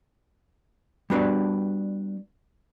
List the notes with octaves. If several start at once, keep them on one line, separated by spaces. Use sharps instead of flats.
G3 B3 D4 F#4 B4 D5